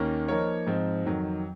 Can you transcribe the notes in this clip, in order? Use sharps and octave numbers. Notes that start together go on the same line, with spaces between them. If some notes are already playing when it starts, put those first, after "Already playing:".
Already playing: D#2 D#3 A#3 C#4
F3 A#3 D#4 A#4 C#5
G#2 F3 C4 D#4
F2 D#3 F#3